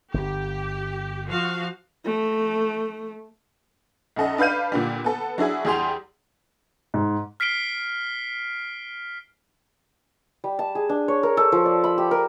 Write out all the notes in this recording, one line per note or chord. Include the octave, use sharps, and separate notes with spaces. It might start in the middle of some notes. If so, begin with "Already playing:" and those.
G1 G4
F3 F#4 F5
A3
B1 F#2 A4 D#5
D4 B4 F5 G6 D#7
A#2 D3 G3
B3 A4
F#3 D4 E4 G#4
E2 G3 G4 G#4 C6 F7
G#2
F6 B6 C7 D7 G7
G3
A5
G#4
D4
C#5
A#4
A4
F3
D5
B5
G4
A#4